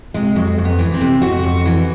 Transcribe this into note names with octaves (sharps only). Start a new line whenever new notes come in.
C3 G#3
F2 F#3
F2
B3
E3
C4
C3
F2 F#4
F2
E3